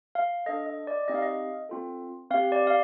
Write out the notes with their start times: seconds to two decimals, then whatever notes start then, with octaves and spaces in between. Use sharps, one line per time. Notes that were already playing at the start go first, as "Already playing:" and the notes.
0.15 F5
0.46 D4 A4 D#5
0.66 D#5
0.87 D5
1.08 C4 D#4 G4 D#5
1.15 F5
1.22 D#5
1.69 C4 F4 A4
2.31 C4 F5
2.34 G4
2.52 D5
2.67 F5